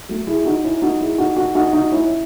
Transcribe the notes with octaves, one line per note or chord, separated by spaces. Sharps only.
F#3 A3
E4 G#4
D#4 F#4
C#4 E4
D#4 F#4
E4 G#4
D#4 F#4
D#4 F#4
D#4 F#4
D#4 F#4
C#4 E4